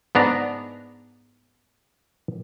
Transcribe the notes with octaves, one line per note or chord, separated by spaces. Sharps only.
G#2 B3 D4 A#5